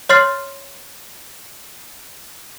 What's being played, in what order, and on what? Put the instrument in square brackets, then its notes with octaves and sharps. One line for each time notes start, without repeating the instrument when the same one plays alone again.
[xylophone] C#5 C6 F6 A6 C7